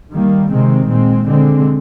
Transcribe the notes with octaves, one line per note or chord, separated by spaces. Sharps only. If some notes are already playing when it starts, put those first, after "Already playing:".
D#3 G3 A#3
C3 D#3 G#3 C4
A#2 G#3 C4
D3 G#3 C4